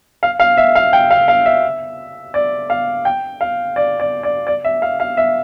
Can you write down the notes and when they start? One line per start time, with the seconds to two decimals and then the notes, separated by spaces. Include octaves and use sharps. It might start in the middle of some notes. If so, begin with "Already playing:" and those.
0.23 F5
0.40 F5
0.57 E5
0.75 F5
0.93 G5
1.11 F5
1.28 F5
1.46 E5
2.34 D5
2.70 F5
3.05 G5
3.41 F5
3.76 D5
4.00 D5
4.23 D5
4.47 D5
4.64 E5
4.82 F5
5.00 F5
5.17 E5